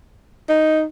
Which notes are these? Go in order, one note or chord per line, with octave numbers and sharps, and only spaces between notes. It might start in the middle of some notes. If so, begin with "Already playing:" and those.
D#4